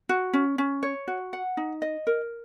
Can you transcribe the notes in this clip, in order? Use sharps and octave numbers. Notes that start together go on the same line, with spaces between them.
F#4
C#4
C#4
C#5
F#4
F#5
D#4
D#5
A#4